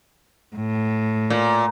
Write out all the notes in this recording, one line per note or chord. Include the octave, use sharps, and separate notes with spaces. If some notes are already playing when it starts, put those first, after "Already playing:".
A2
A#2